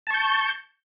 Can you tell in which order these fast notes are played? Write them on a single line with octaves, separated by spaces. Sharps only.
A5 C#6 G6